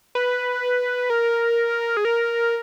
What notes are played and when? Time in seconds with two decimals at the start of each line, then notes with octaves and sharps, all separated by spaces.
0.15 B4
1.10 A#4
1.97 G#4
2.05 A#4